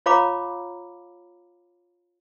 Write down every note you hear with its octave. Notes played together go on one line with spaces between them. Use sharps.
F4 C#5 F5 A#5 B5 D6